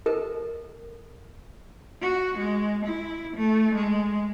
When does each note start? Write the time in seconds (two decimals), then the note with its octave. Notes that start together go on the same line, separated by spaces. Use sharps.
0.06 A4 A#4
2.02 F#4
2.38 G#3
2.86 E4
3.37 A3
3.74 G#3